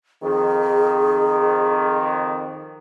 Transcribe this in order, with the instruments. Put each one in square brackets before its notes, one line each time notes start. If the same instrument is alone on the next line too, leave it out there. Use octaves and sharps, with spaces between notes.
[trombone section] F2 D#3 [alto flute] G#4